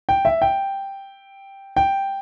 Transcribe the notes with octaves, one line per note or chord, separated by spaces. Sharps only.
G5
E5
G5
G5